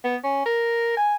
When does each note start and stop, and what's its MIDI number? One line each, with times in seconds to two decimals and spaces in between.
0.04 0.16 59
0.24 0.45 61
0.46 0.97 70
0.97 1.15 80